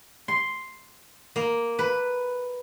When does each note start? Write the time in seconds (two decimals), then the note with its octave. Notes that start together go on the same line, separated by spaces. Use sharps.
0.28 C6
1.36 A#3
1.79 B4